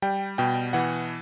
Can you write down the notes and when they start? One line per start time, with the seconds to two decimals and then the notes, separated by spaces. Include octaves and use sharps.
0.02 G3 G5
0.38 B2 G5
0.73 E3 F#5